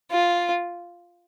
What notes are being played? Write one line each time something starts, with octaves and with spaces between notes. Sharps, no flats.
F4